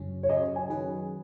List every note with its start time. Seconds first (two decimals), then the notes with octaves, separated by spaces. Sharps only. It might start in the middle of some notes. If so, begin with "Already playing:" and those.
Already playing: F#2 C#3 F#3 C#4
0.23 C#5
0.29 F#2 C#3 F#3 C#4 D#5
0.56 G#5
0.70 D#3 F#3 C#4 G#4 B4